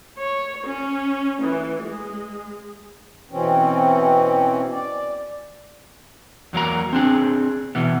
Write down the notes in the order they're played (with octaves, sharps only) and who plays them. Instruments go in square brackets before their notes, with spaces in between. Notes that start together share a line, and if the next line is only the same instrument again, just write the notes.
[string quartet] C#5
C#4
E3
G#3
[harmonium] B2 E3 C4 C#4
D5
[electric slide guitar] E2 F#3 A#3 A#5
C4 D4 G#4
B2 E3 B3